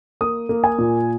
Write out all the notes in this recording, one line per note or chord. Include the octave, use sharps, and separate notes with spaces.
A#3 D#6
A#3
G#5
A#2